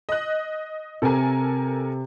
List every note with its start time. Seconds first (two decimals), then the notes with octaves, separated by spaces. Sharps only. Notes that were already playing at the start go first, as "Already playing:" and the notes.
0.09 D#5 F#6
1.02 C3 A4 A#4 G#5